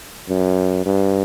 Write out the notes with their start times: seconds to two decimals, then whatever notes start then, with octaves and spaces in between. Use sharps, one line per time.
0.29 F#2
0.86 G2